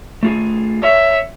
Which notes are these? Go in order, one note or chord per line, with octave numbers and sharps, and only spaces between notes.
A3 F4 G#4
C#5 E5